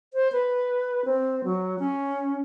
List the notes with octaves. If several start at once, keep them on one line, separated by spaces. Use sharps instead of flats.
C5
B4
C4
F#3
C#4